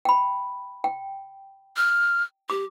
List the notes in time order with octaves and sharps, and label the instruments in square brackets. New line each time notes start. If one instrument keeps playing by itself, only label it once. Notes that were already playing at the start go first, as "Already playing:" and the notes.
[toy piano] G5 B5
G5
[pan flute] F6
[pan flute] G4 [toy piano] D6